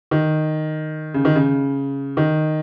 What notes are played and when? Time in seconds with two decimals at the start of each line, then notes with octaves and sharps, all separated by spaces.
0.11 D#3
1.14 C#3
1.25 D#3
1.36 C#3
2.17 D#3